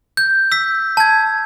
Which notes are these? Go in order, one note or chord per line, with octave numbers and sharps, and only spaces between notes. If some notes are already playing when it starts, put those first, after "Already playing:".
G6
E6 B6
A5 G#6